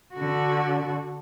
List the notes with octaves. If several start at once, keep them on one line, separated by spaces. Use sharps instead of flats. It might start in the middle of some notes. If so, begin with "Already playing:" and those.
D3 F#4